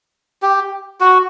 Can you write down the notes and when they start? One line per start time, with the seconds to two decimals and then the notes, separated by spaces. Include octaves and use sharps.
0.42 G4
1.00 F#4